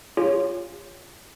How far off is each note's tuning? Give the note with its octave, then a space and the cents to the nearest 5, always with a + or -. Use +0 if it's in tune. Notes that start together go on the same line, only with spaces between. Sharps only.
F4 +0 G#4 -45 C#5 +0